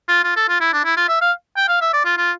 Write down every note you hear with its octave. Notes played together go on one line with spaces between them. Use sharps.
F4
F4
A4
F4
E4
D4
E4
F4
E5
F5
G5
F5
E5
D5
F4
F4